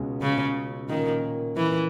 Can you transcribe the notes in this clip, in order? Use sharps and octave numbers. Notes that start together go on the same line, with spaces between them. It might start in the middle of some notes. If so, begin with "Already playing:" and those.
Already playing: C#2 B2 G#3 C#4
C#3
A#2 D#3 A#3 C#4
E3